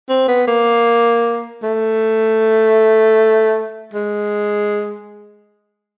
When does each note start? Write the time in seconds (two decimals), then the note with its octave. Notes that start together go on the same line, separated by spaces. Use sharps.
0.09 C4
0.28 B3
0.48 A#3
1.63 A3
3.94 G#3